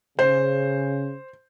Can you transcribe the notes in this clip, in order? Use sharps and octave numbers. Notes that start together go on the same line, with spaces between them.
C#3 C5